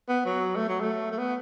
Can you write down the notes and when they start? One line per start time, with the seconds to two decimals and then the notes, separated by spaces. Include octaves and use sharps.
0.09 B3
0.25 F#3
0.56 A3
0.69 F#3
0.81 A3
1.12 A3
1.18 B3